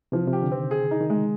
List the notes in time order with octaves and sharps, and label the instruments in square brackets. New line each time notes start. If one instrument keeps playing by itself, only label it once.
[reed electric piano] C3 [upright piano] F3
[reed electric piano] C3
[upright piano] G4
[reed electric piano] D3
[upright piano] C4
[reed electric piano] D#3
[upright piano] G#4
D#4
[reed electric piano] D#3
[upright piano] G#3